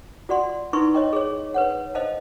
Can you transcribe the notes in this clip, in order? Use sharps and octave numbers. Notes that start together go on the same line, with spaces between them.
F4 F#4 D5 F#5 C6
D#4 E4 B4 C6 C#6
C#5 D#5 G5
G#4 C#5
B4 C#5 F#5
C5 D#5 F5 A5